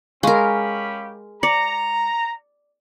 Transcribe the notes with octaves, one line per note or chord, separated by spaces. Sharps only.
G#3 C#4 G4 A#4 F5 B5 C#6
D5 A#5 C#7